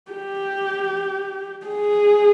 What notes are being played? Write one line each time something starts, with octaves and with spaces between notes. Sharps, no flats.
G4
G#4